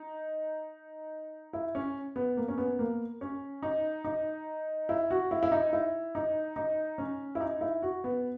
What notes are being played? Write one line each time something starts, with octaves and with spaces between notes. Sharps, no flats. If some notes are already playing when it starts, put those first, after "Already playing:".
Already playing: D#4
E4
C#4
B3
A#3
C#4
B3
A#3
C#4
D#4
D#4
E4
F#4
E4
E4
D#4
E4
D#4
D#4
C#4
E4
D#4
E4
F#4
B3